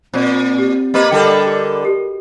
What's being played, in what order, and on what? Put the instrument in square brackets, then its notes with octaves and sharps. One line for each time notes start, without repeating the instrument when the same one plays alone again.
[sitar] A#2 [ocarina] C4 [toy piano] C5 D5
[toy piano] G4
[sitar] A#3 B4 [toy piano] G4 A#4 D#5
[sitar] D3 G3 A4 [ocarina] A#4 [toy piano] G5
[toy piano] G#4
F#4 G4 A4